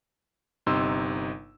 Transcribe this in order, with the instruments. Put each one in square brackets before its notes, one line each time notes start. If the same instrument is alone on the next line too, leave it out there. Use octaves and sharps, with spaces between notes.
[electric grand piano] G1 C3 D#4 C6 E6